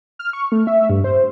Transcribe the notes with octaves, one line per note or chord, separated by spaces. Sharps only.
F6
C#6
A3
E5
G2
C5